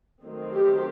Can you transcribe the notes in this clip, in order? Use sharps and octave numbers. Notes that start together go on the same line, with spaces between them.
D#3 F#3 A3 C4 D#4
G4